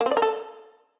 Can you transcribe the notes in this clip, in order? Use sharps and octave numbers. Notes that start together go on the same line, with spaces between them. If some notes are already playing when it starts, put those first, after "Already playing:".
A#3
C4
D5
A#4
A4